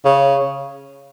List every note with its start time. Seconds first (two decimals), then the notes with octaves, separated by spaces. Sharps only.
0.05 C#3